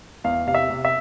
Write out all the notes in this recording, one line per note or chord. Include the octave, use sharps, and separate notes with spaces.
E2 F5
C3 F5
E5
C3
E5